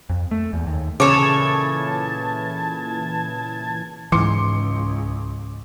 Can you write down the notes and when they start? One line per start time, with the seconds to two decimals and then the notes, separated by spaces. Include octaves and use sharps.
0.10 F2
0.31 A3
0.53 E2
0.67 D#2
1.00 A#2 C#3 E3 A4 C#5 A5 D6 G#6
4.12 C#2 G#2 E3 C6 D6 C#7